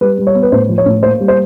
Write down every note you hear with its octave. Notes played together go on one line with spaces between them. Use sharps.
G3 B4
G3
C#5
B3
B4
A2 C5
F3
C#5
A2
A#3 C5
G3
C5